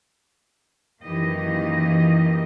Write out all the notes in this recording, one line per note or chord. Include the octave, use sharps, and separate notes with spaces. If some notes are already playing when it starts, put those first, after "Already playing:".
F#2 D#3 E3 A#3 G4 D#5